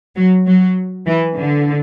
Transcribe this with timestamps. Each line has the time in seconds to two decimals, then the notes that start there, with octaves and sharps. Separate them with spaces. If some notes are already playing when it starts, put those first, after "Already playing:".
0.16 F#3
0.46 F#3
1.06 E3
1.36 D3